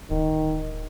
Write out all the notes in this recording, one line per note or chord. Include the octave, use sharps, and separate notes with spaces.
D1 D#3